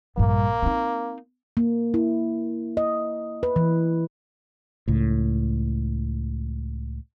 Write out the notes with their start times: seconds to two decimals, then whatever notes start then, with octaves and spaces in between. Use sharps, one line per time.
0.18 A#1 G2 A#3
0.62 C4 D#4
1.57 A#3
1.94 E4
2.77 D#5
3.43 B4
3.56 E3
4.88 C#2 A2